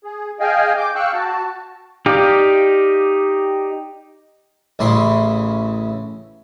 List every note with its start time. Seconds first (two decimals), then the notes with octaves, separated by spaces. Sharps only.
0.04 G#4
0.40 G#4 D#5 F5 G5 G#5
0.78 D6 G6
0.95 F5 G5 C#6 E6 F#6
1.13 F#4 A5
2.06 D#4 G4 D5 F5
4.79 A1 C#3 E4 C6